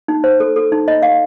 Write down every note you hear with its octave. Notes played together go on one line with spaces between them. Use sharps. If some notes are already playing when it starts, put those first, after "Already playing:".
D#4
C5
A4
A4
D#4
D#5
F5